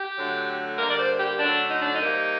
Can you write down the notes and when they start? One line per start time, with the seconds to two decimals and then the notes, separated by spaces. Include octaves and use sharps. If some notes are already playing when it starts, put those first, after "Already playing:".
Already playing: G4
0.18 D3 F#3 A3
0.78 D3 G3 A#3 A#4
0.90 D5
0.99 C5
1.20 G4
1.39 D3 F#3 A3 D4
1.71 D#4
1.82 D4
1.94 D#4
2.01 C3 G3 A#3